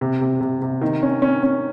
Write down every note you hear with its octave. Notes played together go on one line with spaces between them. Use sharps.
C3
C3
C3
C3
D#3
C#4
C#4
C#4